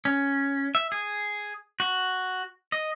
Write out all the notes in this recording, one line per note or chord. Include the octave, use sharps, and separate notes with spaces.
C#4
E5
G#4
F#4
D#5